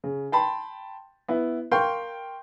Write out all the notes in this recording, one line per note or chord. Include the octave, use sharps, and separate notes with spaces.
C#3
G5 A5 B5 C6
B3 E4
A#4 F5 G5 C6 C#6 G6